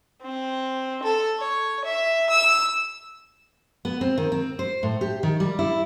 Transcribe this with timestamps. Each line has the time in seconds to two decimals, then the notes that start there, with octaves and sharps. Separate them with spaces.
0.21 C4
1.03 A4
1.38 C#5
1.84 E5
2.30 E6
3.85 B3
4.01 C4
4.18 D#3
4.32 C4
4.59 C5
4.83 A2
5.01 G4
5.23 D#3
5.40 G3
5.59 E4